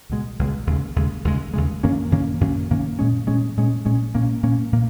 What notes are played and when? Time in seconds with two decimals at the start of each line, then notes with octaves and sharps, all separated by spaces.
0.10 C#2 B2 G#3
0.39 C#2 B2 G#3
0.67 D#2 C#3 G#3
0.96 D#2 C#3 G#3
1.25 D#2 C#3 G#3
1.54 D#2 C#3 G#3
1.83 F#2 D#3 A#3 C#4
2.11 F#2 D#3 A#3 C#4
2.41 F#2 D#3 A#3 C#4
2.70 F#2 D#3 A#3 C#4
2.99 A#2 G#3 C#4
3.27 A#2 G#3 C#4
3.57 A#2 G#3 C#4
3.85 A#2 G#3 C#4
4.15 A#2 A#3 C#4
4.43 A#2 A#3 C#4
4.72 A#2 A#3